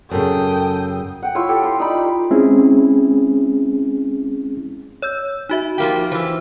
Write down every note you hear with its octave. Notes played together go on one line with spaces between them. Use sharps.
F#2 C#3 A4 G5 D#6
F#5 G5
E4 F4 C#5 E6
G4 A4
C6
D#4 D5 B5
G#3 C4 C#4 E4 G#4
C#5 E6 G6
D#4 F#4 E5
F3 A#3 G4
E3 C5 E6